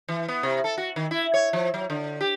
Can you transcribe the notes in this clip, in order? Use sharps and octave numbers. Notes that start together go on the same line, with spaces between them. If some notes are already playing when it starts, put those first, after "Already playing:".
E3
B3
C3
A4
F#4
D#3
E4
C#5
F3
F#3
D3
G4